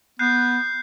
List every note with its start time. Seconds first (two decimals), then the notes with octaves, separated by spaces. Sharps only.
0.19 B3 F#6 G6 C7